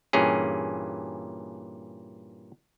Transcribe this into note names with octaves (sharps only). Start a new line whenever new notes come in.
G2 A#2 E3 C#4 G#4